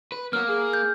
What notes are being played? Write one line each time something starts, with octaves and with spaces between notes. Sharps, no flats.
B4
F#3 A#3 B3 F6
G#4
G6